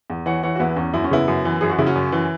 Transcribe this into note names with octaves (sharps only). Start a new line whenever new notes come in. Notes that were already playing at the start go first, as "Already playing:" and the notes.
E2
E3 C#5 F#5
E3 C#5 F#5
F#4
E2 B3 E4
E2 C#4
F#2 E4
C#4
C#3 B3 E4
F#2
E3
F#2 G#4
F#4
C#3 E4
C#4 F#4
F#2
E3